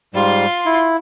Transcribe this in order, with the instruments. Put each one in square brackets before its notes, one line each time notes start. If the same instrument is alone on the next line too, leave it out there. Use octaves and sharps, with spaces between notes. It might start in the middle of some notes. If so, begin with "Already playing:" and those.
[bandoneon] G#2 G3 [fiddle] F4 C6
[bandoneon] E4